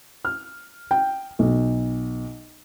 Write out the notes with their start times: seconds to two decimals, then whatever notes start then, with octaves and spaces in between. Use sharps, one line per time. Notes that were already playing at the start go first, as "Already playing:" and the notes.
0.25 F6
0.91 G5
1.39 B1